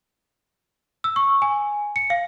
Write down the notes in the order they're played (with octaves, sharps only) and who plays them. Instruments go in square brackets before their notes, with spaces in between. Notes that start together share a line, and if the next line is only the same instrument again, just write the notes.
[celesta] E6
C#6
G#5
C#7
F5